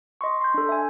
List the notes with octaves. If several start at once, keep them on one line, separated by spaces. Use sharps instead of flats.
D#5 C6 C#6
C6 G6
D4 A4
E5 G#5